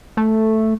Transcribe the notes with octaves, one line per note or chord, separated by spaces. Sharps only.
A3